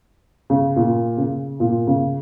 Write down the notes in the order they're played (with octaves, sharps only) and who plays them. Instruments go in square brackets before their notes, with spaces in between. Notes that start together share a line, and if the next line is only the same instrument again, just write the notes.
[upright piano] C#3
A#2
C#3
A#2
C#3